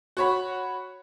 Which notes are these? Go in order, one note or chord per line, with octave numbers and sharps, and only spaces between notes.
F#4 C#5 B5